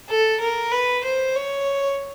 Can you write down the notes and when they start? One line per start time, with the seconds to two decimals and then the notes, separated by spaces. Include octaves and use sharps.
0.08 A4
0.40 A#4
0.72 B4
1.03 C5
1.36 C#5